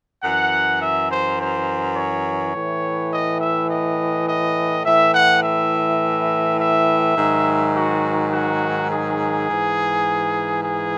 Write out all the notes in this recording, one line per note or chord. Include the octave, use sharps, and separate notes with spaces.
F#2 E3 F#5
E5
C5
C5
C#5
A2 E3
D#5
E5
D#5
D#5
A2 E3 E5
F#5
E5
E5
G#2 D#3 F#3
F#4
F#4
G#4
G#2 E3
G#4